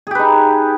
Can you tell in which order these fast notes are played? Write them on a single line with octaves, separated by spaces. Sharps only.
G#4 G4 B4 D#4